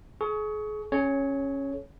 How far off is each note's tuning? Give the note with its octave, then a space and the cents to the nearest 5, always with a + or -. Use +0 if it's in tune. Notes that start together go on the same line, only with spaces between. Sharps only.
G#4 +35 C#6 +10
C#4 -10 G#4 +45 C#5 +0